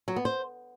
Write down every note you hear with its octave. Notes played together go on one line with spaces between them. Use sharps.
F#3
B3
C5